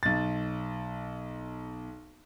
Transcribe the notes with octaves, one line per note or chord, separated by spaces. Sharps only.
B1 A6